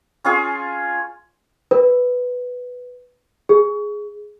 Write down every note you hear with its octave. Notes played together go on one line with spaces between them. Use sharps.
C#4 F4 G#4
B4
G#4